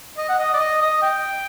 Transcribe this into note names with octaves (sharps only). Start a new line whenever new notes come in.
D#5
F#5
D#5
D5
D#5
D#5
G5